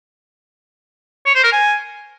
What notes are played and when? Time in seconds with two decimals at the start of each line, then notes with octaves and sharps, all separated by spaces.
1.26 C#5
1.35 C5
1.44 A#4
1.53 G#5